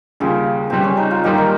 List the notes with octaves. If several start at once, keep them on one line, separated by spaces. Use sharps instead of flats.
D#2 C#3 G3 F4 G#4
C#2 C3 G3 C4
C#4
D#4
F4
G#2 D#3 G3 A#3 D#4 G4
A#4